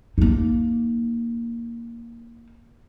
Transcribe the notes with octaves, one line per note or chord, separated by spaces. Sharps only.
A#3 D#4